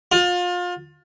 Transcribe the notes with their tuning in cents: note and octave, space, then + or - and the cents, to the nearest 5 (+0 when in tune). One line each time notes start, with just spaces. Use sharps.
F4 +30